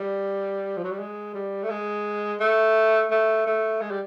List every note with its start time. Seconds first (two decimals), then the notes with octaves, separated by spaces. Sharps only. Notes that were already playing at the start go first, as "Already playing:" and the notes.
Already playing: G3
0.77 F3
0.84 F#3
0.91 G3
0.99 G#3
1.34 G3
1.63 A3
1.70 G#3
2.40 A3
3.11 A3
3.46 A3
3.81 G#3
3.91 G3